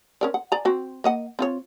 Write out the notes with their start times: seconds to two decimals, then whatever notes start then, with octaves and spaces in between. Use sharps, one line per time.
0.21 C#4 A#4 D5
0.34 F#5
0.52 D5 G#5 A#5
0.65 C4 F#4
1.04 A#3 D#5 F#5
1.39 C4 F4 C#5